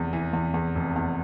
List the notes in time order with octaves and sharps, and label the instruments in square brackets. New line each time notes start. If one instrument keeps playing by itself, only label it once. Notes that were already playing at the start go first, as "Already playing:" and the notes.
Already playing: [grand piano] F1 E2 E3
E3
E2
E2
F1
E2